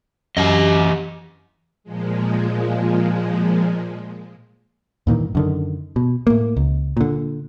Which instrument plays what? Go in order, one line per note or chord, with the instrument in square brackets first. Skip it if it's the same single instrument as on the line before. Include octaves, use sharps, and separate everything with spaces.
[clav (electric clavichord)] F#2 [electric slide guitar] E3 G4 D#5
[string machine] A#2 F3 G#3
[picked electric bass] G2 A#2 D#3 E3
F#2 D3 D#3
B2
A2 A#3
C#2
A#2 D3